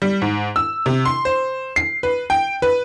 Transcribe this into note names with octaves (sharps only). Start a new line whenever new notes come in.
G3
G#2
E6
C3
C6
C5
C7
B4
G5
B4